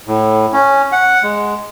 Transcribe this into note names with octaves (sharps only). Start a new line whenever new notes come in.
A2
C#4
F#5
G#3